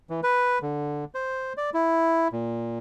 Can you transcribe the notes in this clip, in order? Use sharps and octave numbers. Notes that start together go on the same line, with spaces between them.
E3
B4
D3
C5
D5
E4
A#2